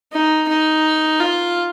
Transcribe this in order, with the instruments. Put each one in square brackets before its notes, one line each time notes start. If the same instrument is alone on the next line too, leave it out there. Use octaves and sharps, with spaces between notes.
[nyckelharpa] D#4
D#4
F4